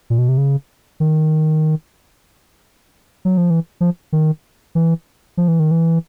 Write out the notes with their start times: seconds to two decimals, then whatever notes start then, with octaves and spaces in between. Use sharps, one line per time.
0.10 A#2
0.18 B2
0.28 C3
0.38 C#3
1.00 D#3
3.25 F#3
3.37 F3
3.50 E3
3.81 F3
4.12 D#3
4.75 E3
5.37 F3
5.48 E3
5.60 D#3
5.71 E3